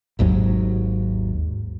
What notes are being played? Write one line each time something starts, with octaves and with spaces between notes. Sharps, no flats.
G#1 D#2 G#2 F#3